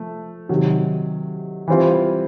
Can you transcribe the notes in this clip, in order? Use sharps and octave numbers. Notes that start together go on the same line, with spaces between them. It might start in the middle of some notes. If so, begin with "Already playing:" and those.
Already playing: F3 A3
C3 D#3 F#3
E3 G3 C4 F4